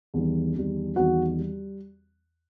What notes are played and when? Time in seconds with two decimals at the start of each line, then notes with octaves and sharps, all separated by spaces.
0.14 E2 D#3 G3
0.56 E2 D#3 G3
0.96 E2 D#3 G3 F#4 F#5
1.39 G3